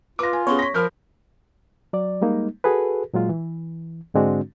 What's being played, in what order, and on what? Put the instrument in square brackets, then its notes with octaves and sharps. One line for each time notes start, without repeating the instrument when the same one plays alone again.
[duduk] F4 [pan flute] B4 [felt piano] D6 A#6
[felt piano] G#5
[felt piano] B3 C#4 G#4 [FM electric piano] C#5 [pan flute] C6
[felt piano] A#6 B6
[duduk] F3 [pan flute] A#4 [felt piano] B5 F6 G6
[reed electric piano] F#3 D5
G3 G#3 A#3 D#4
F#4 G#4 A4 B4
A#2 F#3 G#3 F4
E3
G#2 D3 G#3 C4 D4 F#4